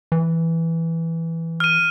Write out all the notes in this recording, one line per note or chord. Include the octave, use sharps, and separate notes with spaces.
E3
F6 D#7